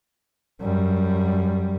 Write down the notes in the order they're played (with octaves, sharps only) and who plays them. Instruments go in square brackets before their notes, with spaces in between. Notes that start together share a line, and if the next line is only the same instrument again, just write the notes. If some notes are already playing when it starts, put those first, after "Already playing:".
[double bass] F#2 G3